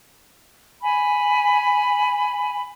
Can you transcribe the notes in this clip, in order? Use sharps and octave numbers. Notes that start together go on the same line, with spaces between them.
G#5 B5